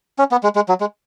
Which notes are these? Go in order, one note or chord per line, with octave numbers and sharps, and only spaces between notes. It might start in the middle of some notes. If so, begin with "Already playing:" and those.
C#4
B3
G#3
G#3
F#3
G#3